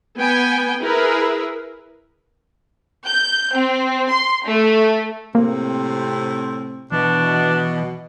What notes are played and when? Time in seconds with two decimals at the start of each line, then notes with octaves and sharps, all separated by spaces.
0.17 B3 G5 G#5
0.82 E4 G#4 A#4 B4
3.06 G6
3.52 C4
4.11 C6
4.44 A3
5.35 A2 C3 A#3 C4
6.92 B2 E3 D4